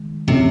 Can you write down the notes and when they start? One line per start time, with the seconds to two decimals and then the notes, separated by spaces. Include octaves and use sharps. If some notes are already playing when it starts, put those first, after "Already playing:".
Already playing: D#3 G#3
0.27 C3 E3 A3 C#4